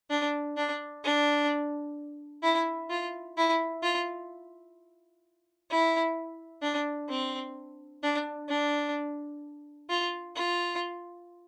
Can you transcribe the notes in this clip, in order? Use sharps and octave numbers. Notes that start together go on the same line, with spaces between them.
D4
D4
D4
E4
F4
E4
F4
E4
D4
C4
D4
D4
F4
F4